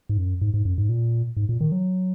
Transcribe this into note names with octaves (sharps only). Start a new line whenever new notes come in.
G#2
F#2
G#2
G#2
F#2
G#2
A#2
G#2
A#2
D#3
F#3